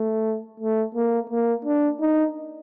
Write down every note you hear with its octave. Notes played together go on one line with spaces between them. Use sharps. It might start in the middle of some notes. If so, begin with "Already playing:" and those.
Already playing: A3
A3
A#3
A#3
D4
D#4